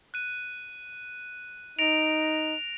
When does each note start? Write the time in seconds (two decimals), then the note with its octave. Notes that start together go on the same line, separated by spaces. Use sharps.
0.14 F#6 D#7
1.79 D#4 A#6 D7 F7